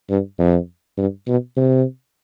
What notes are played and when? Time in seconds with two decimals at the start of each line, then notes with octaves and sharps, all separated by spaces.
0.10 G2
0.39 F2
0.98 G2
1.28 B2
1.57 C3